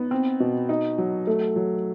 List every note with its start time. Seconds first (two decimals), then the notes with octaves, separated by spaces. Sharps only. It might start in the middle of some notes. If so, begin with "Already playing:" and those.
Already playing: B3 D#4
0.11 C4
0.40 B2
0.69 D#4
0.98 F#3
1.27 A3
1.56 F#3